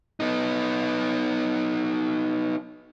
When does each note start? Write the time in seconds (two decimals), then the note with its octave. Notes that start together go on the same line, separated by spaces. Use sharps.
0.20 B3 D#4